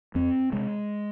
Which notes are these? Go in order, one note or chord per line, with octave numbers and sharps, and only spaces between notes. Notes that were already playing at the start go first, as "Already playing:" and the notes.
F2 C4
C3 G#3